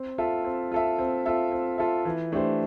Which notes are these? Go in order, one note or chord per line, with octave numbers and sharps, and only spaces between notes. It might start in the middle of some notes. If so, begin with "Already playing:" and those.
Already playing: C4
F4 A4 E5
C4
F4 A4 E5
C4
F4 A4 E5
C4
F4 A4 E5
E3
A3 D4 G4 C5